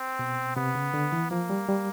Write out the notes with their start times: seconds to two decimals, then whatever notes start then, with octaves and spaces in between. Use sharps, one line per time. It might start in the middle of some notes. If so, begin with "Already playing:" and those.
Already playing: C4
0.19 B2
0.56 C3 B3
0.75 C#3
0.94 D3
1.12 E3
1.31 F3 A#3
1.50 G3
1.69 G3